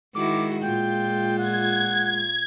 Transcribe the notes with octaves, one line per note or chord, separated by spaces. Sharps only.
D#3 G#3 E4 F#4 D6
A#2 F4 G5
F#5 G#6